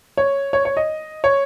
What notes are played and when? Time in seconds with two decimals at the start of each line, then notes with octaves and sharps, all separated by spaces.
0.17 C#5
0.53 C#5
0.65 C#5
0.77 D#5
1.24 C#5